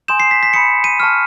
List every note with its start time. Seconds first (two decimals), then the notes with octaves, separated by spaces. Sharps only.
0.08 G#5 C6 D#6 G6 E7
0.20 C7
0.31 B6
0.43 B6
0.53 B5 D#6 G6 C#7
0.84 D#7
1.00 A5 C#6 F6